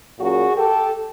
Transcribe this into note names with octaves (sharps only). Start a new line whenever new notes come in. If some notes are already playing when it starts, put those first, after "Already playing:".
A#2 F#3 A#3 C#4 F#4 G#4
G4 A4